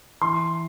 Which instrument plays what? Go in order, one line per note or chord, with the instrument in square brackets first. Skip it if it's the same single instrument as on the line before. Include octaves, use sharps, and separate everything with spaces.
[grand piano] E3 C6